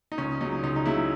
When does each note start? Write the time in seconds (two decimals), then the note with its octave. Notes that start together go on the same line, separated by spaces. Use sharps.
0.12 D#4
0.18 C#2 C#4
0.41 C#3 F#3 D#4
0.63 C#2 D#4
0.76 D#4
0.85 C#3 F#3 E4